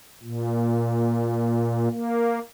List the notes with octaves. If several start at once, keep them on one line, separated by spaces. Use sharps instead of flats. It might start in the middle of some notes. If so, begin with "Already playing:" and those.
A#2
A#3